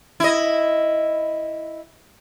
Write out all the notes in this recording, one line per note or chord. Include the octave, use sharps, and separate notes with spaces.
E4 D#5